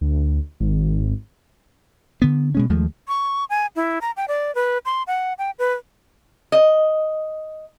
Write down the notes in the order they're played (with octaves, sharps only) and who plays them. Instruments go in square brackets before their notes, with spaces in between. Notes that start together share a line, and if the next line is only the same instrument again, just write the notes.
[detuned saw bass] D2
G#1
[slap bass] D3 B3
B2 G#3 C#4
D#2 F3 G#3 A3
[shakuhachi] C#6
G#5
E4
A#5
G5
D5
B4
C6
F#5
G5
B4
[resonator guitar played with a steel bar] D#5